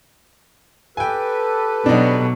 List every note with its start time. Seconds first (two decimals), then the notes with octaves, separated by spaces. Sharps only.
0.97 G4 A4 B4 G5 G#5
1.86 B2 F#3 D4 D#4